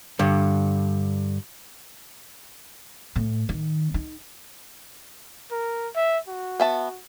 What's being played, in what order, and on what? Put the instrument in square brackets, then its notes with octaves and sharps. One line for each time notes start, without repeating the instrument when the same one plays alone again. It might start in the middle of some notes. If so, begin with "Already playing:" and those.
[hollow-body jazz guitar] G2 D3
[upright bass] A2
D#3
D#4
[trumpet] A#4
E5
F#4
[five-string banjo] B3 E5 A5